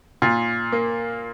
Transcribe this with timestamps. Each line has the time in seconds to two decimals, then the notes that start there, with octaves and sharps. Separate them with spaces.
0.22 A#2
0.72 A#3